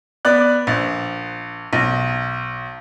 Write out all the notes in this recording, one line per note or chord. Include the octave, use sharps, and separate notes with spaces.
B3 D5 F#6
A#1
B1